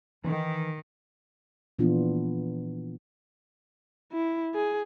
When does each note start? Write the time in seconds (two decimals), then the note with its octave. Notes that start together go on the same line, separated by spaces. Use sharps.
0.24 D#3 E3
1.79 A#2 E3 F3 B3 D4 F4
4.13 E4
4.54 G#4